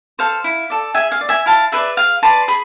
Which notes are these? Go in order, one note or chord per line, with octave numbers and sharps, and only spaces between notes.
A4 C5 F5
E4
A4 D5
G#4 E5 G#5
F5
D5
E5 G#5
E4 F5 A5
G#4 B4 D5 E5
G#4 F5
B4 D5 A5 C6
G#4 B5